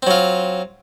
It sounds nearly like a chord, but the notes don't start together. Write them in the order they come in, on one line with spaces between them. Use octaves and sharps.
C4 F#3 F4